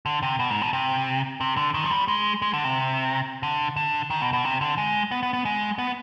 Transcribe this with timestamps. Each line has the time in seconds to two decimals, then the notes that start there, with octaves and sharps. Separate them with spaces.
0.06 D3
0.23 C3
0.39 B2
0.50 G#2
0.61 B2
0.73 C3
1.40 C3
1.57 D3
1.74 D#3
1.84 F3
1.91 G3
2.08 G#3
2.42 G#3
2.53 D3
2.64 C3
3.43 D3
3.76 D3
4.10 D#3
4.21 B2
4.33 B2
4.44 C3
4.61 D3
4.78 G#3
5.11 B3
5.23 B3
5.33 B3
5.45 G#3
5.78 B3